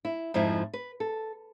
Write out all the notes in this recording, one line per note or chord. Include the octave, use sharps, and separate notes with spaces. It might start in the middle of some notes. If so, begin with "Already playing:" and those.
E4
F2 G#2 F3 E4
B4
A4